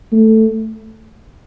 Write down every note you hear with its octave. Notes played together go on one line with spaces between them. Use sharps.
A3